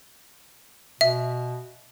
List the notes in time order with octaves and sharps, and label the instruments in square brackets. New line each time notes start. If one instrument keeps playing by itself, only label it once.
[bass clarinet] B2 [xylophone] E5